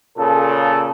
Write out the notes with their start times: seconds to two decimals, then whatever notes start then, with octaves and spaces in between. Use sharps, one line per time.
0.17 A#2 C#3 A4